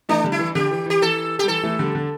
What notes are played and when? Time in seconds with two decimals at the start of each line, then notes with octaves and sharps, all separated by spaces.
0.09 E3 A3 D4
0.24 D3 G3
0.32 E4
0.39 E3
0.55 D3 G4
0.71 E3
0.86 E3 G4
1.01 E3 A4
1.39 G4
1.43 G3
1.48 E3 A4
1.63 E3 A3
1.79 D3 G3
1.95 D3